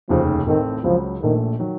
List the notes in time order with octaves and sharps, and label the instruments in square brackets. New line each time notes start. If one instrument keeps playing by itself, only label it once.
[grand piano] F1 D#2 C#3 [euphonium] F3
[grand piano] A1 A2 A3 C4 [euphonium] D#3
[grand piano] C#2 C#3 F#3 [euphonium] F3
[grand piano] A#1 A#2 A3 D#4 [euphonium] D#3
[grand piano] D#3 F#3